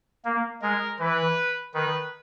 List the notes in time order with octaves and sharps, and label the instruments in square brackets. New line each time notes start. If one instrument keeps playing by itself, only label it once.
[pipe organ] A#3
[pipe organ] G#3 [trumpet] A#4
[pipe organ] E3 [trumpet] B4
[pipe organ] D#3 [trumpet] B4